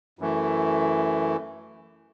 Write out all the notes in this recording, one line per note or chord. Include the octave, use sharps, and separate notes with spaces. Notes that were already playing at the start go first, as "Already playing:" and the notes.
F#2 E3 A3